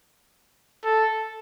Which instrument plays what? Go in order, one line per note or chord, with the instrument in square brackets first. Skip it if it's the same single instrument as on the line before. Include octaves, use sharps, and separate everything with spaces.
[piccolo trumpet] A4